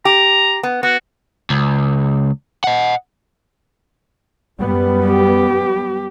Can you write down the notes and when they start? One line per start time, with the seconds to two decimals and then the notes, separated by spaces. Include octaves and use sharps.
0.05 G4 A#5
0.63 B3
0.83 B3 F#4
1.50 C#2
2.64 D#5 F#5
4.58 F#2 G3 B3
5.06 G4